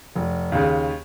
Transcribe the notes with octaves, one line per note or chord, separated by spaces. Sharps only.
F1
D#2 C#3